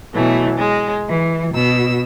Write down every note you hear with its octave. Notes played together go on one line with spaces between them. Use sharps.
B2 E3 F#3 A3
G#3
E3
B2 E6